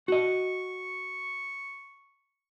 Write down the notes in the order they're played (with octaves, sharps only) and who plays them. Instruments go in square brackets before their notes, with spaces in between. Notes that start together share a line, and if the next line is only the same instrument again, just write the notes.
[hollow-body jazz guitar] F#4 D#5 [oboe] C#6